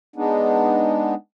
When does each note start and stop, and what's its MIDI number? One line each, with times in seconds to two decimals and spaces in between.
0.16 1.14 56
0.16 1.14 59
0.16 1.14 62
0.16 1.14 63